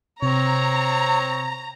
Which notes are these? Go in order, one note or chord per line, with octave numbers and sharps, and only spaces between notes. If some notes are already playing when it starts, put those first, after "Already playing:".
C3 C4 C#5 A#5